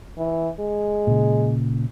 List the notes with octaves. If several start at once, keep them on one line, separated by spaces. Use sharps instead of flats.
E3
G#3
A#2 C#3